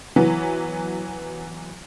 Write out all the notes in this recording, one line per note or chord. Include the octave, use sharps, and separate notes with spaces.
E3 F#3 B3